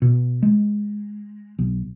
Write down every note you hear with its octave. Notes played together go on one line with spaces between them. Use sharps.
B2
G#3
B1